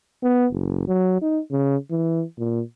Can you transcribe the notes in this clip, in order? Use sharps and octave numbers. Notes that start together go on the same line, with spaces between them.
B3
F#1
F#3
D#4
C#3
E3
A#2